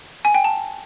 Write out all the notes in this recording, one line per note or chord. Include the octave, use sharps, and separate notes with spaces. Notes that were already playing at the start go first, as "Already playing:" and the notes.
G#5
G5
A5